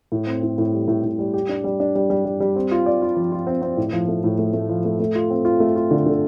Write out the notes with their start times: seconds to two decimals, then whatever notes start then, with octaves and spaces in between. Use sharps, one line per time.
0.12 A2
0.27 C4
0.43 A2
0.58 A2
0.73 G3
0.88 A2
1.04 A2
1.19 G3
1.34 G4
1.49 D4
1.64 G3
1.80 D4
1.95 G3
2.10 G3
2.25 G3
2.40 G3
2.56 C4
2.71 F4
2.86 D5
3.02 F4
3.16 F3
3.32 F4
3.47 C4
3.62 C4
3.77 A2
3.92 F3
4.08 A3
4.24 A2
4.39 A3
4.54 A3
4.69 F3
4.85 A3
5.00 A3
5.15 F4
5.30 C4
5.45 F4
5.60 A3
5.76 F4
5.91 D3
6.06 D3